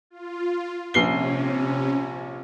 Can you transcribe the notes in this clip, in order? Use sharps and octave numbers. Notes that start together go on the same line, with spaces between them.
F4
A#1 C3 C#4 C7 G7